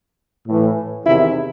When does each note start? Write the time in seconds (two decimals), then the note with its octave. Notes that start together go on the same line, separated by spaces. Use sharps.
0.48 A2 E3
1.05 E2 C3 D#3 E4